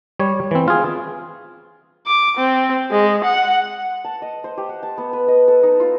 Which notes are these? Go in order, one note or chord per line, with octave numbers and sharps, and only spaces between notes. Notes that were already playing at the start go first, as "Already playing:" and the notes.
G3 C#5
E3 C4
F4 G#4
D6
C4
G#3
F#5
A5
D#5
C5
G4
F#5
A5
B3
B4
D#5
A4
D#4
F4